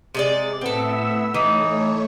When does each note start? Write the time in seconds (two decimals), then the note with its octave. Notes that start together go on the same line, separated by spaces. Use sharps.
0.15 C3 G#3 D5
0.61 A2 B3 C4 A4 E5 E6
1.34 E3 A3 D#4 C#5